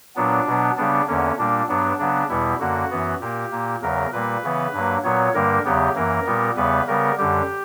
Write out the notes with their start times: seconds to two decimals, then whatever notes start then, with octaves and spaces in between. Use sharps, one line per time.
0.16 A#2 F#3 B3 D4
0.46 B2 F#3 B3
0.77 C#3 G3 B3 D4
1.07 E2 D3 A#3 C#4
1.38 A#2 G3 A#3 D4
1.69 G2 F#3 B3 D4
1.99 C#3 F#3 B3 D4
2.29 E2 B2 G3 B3 E4
2.60 F#2 D3 A#3 F#4
2.91 F#2 E3 B3
3.21 A#2 A#3 G4
3.51 A#2 A#3
3.82 E2 C#3 F#3 A#4
4.13 A#2 G3 A#3 B4
4.43 C#3 E3 B3
4.73 G2 F#3 A#3
5.04 A#2 F#3 B3 C#5
5.34 G2 D3 G3 A#3 A#4
5.65 E2 C#3 F#3 B3 G4
5.95 F#2 E3 A#3 A#4
6.26 A#2 G3 B3
6.56 E2 C#3 G3 B3 B4
6.87 C#3 G3 B3 A#4
7.18 F#2 D3 G3 G4